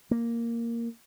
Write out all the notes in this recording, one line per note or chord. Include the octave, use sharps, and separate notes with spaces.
A#3